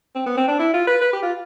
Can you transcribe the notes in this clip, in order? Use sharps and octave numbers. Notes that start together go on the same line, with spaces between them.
C4
B3
C4
D4
E4
F4
B4
B4
G4
F4